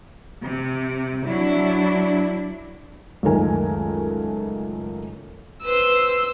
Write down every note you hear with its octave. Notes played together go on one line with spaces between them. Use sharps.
C3
F#3 D4 E4
C#2 F#2 D#3 A3 A#4 G#5
B4 C5 E6